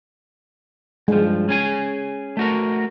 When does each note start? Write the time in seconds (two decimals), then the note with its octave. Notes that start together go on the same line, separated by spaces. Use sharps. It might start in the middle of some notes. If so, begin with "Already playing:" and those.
1.08 G2 F3 G#3
1.49 C#4 G#4 G#5
2.37 A3 F#4 A#4